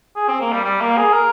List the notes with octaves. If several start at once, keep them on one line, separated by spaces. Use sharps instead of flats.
G#4
C4
A#3
G3
G3
A#3
G#4
A#4